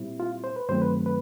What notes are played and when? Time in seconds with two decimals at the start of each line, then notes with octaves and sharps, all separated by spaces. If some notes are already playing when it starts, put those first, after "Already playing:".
Already playing: A#2 G3 C4 E4
0.20 F4
0.44 C5
0.56 B4
0.69 G2 D#3 F#3 A3 C4 C5
0.81 B4
1.06 B4